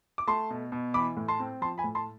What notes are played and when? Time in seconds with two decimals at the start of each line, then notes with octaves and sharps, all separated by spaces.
0.18 D6
0.27 A3 A5 C6
0.50 B2
0.72 B2
0.94 E3 B5 D6
1.17 A2
1.28 A5 C6
1.40 C4
1.61 F3 A5 C6
1.78 G#5 B5
1.84 A2
1.95 A5 C6